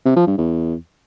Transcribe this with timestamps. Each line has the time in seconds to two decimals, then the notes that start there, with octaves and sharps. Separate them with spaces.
0.05 C3
0.16 F3
0.27 G2
0.38 E2